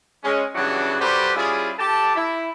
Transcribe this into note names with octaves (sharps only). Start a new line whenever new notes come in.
G#3 C#4
C#3 E3 F#3 G3 D4 F#4
G3 F#4 G4 A4 B4 C5
G3 C#4 E4 F4 G#4
G4 A4 G5 A5
E4